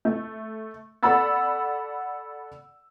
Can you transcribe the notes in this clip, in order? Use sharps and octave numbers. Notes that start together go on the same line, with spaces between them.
A3
A4 D5 F#5 B5 E6 A6